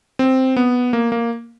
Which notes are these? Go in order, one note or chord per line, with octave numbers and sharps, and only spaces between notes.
C4
B3
A#3
A#3